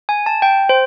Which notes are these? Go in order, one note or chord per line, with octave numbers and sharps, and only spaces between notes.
G#5
A5
G5
C5